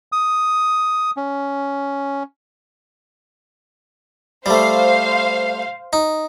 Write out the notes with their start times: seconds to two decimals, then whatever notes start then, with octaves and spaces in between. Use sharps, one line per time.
0.12 D#6
1.17 C#4
4.46 G3 A3 C5 F5
5.93 D#4